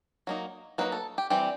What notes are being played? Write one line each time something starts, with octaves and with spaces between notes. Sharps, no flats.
F#3 A#3 D#4
F#3 A#3 D#4 B4
A4
G4
E3 G3 C4 G4